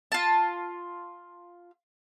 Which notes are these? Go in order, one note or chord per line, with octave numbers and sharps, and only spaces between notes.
F4 A5